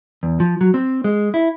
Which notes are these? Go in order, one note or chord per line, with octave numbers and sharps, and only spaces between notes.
E2
F3
F#3
C4
G#3
E4